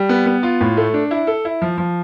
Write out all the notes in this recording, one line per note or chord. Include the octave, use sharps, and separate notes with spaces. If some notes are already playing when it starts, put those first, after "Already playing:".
Already playing: G3
B3
B3
F4
A2
A3
D4
E4
A4
E4
F3
F3